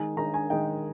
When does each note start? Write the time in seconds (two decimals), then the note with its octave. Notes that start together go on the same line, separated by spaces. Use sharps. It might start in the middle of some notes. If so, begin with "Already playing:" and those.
Already playing: D#3 G#3 D#4 G#5
0.17 D#3 G#3 D#4 A#5
0.34 G#5
0.50 D#3 G#3 D#4 G5